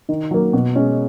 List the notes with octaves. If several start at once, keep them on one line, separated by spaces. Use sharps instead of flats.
D#3
F#3 A#3
B2
G#3 C#4